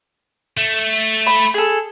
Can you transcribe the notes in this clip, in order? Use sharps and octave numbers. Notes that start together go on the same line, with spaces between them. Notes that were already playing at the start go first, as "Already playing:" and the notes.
A3
B5
G#4 A4